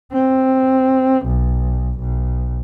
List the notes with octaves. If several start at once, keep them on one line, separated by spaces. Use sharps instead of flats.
C4
B1
B1